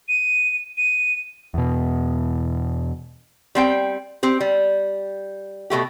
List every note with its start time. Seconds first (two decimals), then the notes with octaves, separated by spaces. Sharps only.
0.09 D#7
0.77 D#7
1.54 E2 B2
3.55 G3 C4 G5
4.23 C4 G4
4.40 G3
5.70 B2 G#3 A3 G4